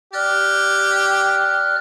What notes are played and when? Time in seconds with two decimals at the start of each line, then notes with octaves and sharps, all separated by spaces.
0.13 G4 D5 F6 F#6